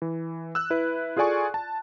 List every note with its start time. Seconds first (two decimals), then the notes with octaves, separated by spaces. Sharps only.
0.02 E3
0.55 E6 F#6
0.70 E4 B4
1.17 F4 G#4 A4 D5 G#5 C#6
1.54 A5